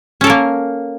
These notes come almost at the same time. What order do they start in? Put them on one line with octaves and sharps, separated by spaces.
C#4 A4 A#4 A#3